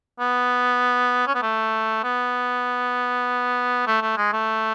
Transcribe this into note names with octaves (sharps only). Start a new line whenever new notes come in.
B3
C#4
B3
A3
B3
A3
A3
G#3
A3